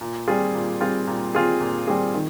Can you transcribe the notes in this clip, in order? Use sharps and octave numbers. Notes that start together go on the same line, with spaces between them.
A#2
G3 C4 F4 G#4
A#2
G3 C4 F4 G#4
A#2
G3 C4 F4 G#4
A#2
G3 C4 F4 G#4
D#3